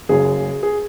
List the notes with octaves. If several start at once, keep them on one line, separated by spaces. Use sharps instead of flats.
F#1 F#2 C#3 G#4
G#4